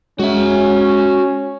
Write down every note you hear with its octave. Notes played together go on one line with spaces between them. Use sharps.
G#3 C#4 F#4 E5